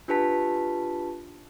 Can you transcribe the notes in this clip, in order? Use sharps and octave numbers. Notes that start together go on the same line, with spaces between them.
D4 F4 G4 B4 A5 B6